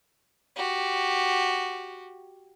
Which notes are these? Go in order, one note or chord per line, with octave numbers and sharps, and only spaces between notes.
F#4 G4